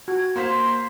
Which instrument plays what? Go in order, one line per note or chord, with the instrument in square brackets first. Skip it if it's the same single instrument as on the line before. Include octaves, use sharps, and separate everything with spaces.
[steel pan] F#4 [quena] G#6
[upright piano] A#3 C5 B6 [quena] C6